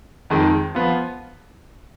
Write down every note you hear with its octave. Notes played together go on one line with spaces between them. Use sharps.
F2 D#3 G#3
F3 B3 F4